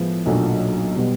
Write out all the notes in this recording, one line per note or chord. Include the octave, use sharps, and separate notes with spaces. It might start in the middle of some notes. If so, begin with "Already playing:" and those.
Already playing: A2 F3 G#3 B3
B1 A#2 F#3 A3 D4
B2 G3 B3